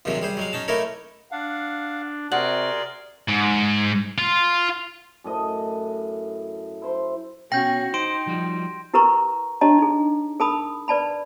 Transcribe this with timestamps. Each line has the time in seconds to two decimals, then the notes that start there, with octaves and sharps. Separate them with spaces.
0.05 A#1 D#2 C3 F3 F#3 G#3
0.22 G3 G#4 C5
0.37 F#3 G#3 F5
0.53 C#4 D#4 A5
0.68 A3 A#3 D#4 E4 A#4 C#5
1.32 D4 F5 F#5
2.32 C3 F#4 G#4 A#4 D5 F#5 C6
3.28 G#2
4.18 F4
5.24 F#2 A2 D#5
6.82 E4 C5 C6
7.52 B2 C#4 F#4 G5 G6 A#6
7.94 D#4 C5 C6 D7
8.27 F3 G3 F#4
8.94 E4 G4 A#4 B4 A#5 C#6
9.61 D4 G4 C#5 D#5 A5 A#5
9.79 D#4 G#4
10.40 G#4 A#4 A5 B5 D#6
10.88 B4 D5 A5 B5